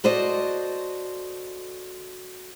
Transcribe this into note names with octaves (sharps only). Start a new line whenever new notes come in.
F#4 A4 C5 D5 D#5